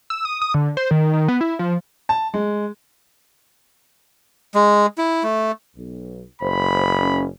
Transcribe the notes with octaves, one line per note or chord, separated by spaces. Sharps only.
E6
D#6
D#6
D3
C5
D#3
D#3
B3
E4
F3
A5
G#3
G#3
E4
A3
B1
F#1 C5 B5
C#4